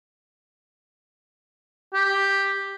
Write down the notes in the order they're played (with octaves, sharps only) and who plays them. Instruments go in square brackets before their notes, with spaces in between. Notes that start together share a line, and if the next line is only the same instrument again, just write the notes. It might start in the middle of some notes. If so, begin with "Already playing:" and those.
[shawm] G4